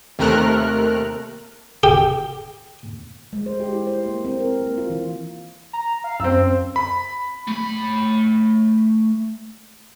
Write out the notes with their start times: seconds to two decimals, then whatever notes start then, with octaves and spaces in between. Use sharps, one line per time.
0.19 D#2 C3 A3 A#4 F6 F#6
1.83 G4
3.33 G#3
3.46 C5
3.60 G4
3.72 E4
3.87 C5
4.06 A#3
4.25 C4
4.40 A#4
4.62 A#3
4.78 F4
4.90 E3
5.73 A#5
6.04 F5
6.20 F#2 C4 E6
6.76 B5
7.48 A3 B5